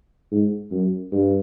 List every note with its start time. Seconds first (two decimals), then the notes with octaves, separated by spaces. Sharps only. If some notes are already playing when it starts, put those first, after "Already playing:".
0.31 G#2
0.71 F#2
1.12 G2